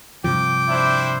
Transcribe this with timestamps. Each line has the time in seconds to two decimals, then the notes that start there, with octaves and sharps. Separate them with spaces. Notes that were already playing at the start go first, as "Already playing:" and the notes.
0.24 G2 C3 F3 G5 D6
0.69 D4 E4 C5